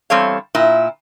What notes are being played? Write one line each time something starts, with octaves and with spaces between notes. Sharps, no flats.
E2 G3 C4 A4 C#5 F5
A#2 E4